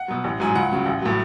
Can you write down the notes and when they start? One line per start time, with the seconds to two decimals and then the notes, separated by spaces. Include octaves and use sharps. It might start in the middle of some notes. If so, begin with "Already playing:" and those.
Already playing: F#5
0.08 B2 F#3
0.24 A1
0.40 G#2 F#3 G#5
0.55 C#2 F#5
0.71 C#3 F#3
0.86 A1
1.02 A2 F#3